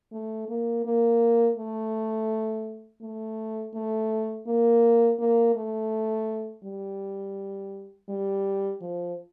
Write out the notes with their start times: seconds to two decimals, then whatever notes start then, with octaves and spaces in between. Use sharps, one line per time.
0.12 A3
0.49 A#3
0.85 A#3
1.57 A3
3.02 A3
3.75 A3
4.47 A#3
5.19 A#3
5.55 A3
6.64 G3
8.09 G3
8.81 F3